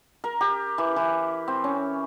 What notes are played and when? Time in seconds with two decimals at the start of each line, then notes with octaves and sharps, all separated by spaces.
0.24 A#4
0.41 G4
0.78 E3
0.96 E3
1.48 C4
1.64 C#4